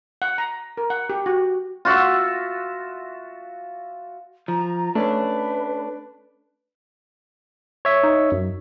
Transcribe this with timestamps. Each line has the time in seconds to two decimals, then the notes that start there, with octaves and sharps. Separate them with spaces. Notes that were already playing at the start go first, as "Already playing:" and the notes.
0.22 F#5
0.38 A#5
0.77 A#4
0.90 F#5
1.10 G4
1.26 F#4
1.85 F4 F#4 E5
4.48 F3 A#5
4.95 A3 C#4 D4 B4
7.85 C#5 E5
8.03 D#4
8.32 F#2